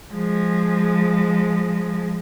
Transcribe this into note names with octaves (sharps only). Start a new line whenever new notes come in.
F3 G#3